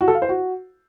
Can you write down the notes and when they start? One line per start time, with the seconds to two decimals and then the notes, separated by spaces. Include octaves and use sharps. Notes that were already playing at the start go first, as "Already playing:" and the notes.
0.01 F#4
0.08 A4
0.15 F5
0.22 C5
0.29 F#4